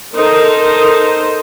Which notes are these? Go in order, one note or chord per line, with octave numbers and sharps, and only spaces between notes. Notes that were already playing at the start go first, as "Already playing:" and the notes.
D#4 A4 A#4 C5